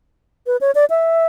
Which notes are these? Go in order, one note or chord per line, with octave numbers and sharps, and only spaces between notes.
B4
C#5
D5
E5